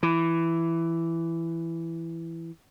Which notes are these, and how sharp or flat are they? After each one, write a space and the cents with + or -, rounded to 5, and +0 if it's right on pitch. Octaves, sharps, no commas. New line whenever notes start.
E3 +10